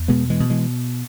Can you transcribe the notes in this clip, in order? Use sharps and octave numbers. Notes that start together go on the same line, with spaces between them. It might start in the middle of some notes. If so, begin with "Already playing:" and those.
Already playing: E2
B2 G#3 B3
E3 G#3
B2
E3 G#3